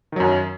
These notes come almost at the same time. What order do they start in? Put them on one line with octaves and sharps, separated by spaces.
D#3 F#3 F#2